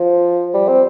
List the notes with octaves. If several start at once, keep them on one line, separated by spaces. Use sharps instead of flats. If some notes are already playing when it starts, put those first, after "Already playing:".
Already playing: F3
G3
C4